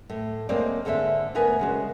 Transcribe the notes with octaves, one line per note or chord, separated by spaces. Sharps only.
A2
G#3 A#3 C4 D4 C#5 D5
G#2 D3 A4 A#4 E5
D2 B3 A#4 B4 G#5
C#3 G#3 F#4